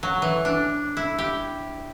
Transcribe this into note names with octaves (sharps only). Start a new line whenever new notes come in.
F#3
E3
D4
E4
G4